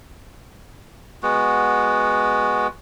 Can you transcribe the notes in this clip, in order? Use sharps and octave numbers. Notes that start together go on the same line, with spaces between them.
G#3 B3 F#4